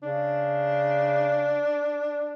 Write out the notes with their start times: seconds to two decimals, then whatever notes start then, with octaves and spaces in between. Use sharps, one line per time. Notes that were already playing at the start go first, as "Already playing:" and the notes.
0.03 C#3 D4